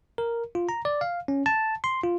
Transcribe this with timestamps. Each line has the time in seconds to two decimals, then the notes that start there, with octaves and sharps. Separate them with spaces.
0.18 A#4
0.55 F4
0.69 A#5
0.85 D5
1.01 F5
1.28 C#4
1.46 A5
1.84 C6
2.03 F4